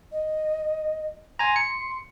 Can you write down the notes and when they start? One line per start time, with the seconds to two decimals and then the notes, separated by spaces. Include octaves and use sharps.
0.12 D#5
1.39 G#5 A#5 C6
1.56 C#7